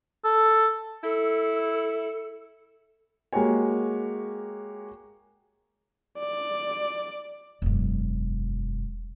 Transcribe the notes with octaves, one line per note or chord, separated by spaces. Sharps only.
A4
E4 A4
G#3 A#3 F#4 G4 C#5 G#5
D5
E1 F#2